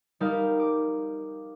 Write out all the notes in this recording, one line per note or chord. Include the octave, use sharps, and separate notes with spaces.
G3 D#4 G4 A#4 F5
D6